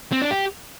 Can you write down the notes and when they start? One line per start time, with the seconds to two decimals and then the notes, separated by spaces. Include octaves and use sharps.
0.12 C4
0.21 D4
0.31 G4